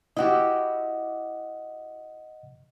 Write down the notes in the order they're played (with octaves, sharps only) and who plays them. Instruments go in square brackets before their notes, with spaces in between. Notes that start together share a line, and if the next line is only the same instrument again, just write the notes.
[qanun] E4 F#4 G4 [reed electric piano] D#5 F#5